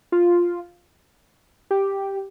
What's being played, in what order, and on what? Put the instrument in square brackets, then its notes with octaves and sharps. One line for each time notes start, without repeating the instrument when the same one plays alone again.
[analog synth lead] F4
G4